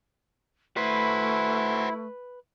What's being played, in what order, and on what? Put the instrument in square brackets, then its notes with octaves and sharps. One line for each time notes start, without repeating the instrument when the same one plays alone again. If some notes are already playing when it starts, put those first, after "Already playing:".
[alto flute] A3 [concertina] E4 [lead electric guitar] F#4 C5 [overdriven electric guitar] B4